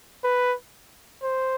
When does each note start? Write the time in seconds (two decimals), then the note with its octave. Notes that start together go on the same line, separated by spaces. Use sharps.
0.24 B4
1.23 C5